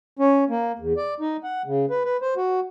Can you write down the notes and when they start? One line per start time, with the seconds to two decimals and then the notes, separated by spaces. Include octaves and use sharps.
0.19 C#4
0.49 A#3
0.79 E2
0.97 D5
1.20 D#4
1.44 F#5
1.66 C#3
1.90 B4
2.05 B4
2.22 C5
2.37 F#4